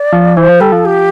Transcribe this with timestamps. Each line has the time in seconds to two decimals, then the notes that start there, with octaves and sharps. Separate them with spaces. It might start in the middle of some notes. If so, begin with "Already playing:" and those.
Already playing: D5
0.13 F3
0.37 E3 C5
0.49 F3
0.61 G3 A4
0.72 F3
0.85 G4